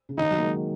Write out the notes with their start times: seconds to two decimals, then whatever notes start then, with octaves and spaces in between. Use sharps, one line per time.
0.09 C#3
0.18 D#3 D#4
0.31 F#3
0.38 A#3
0.44 G#3